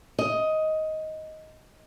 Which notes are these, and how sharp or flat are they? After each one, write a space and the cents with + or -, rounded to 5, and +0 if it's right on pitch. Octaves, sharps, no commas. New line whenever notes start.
D#5 +10